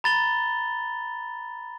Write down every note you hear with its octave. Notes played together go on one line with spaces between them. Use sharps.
A#5 B5 A6 F7 G7